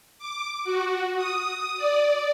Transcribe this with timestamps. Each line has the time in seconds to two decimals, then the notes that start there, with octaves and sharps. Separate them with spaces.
0.19 D6
0.64 F#4
1.16 D#6
1.77 D5